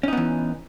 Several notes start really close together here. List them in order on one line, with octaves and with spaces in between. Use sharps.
C#4 D#4 B3 E3